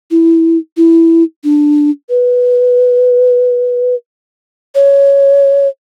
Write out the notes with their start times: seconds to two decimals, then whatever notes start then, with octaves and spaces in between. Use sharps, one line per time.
0.11 E4
0.77 E4
1.44 D4
2.09 B4
4.75 C#5